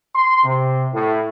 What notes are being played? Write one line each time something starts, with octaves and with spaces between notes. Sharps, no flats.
C6
C3
A2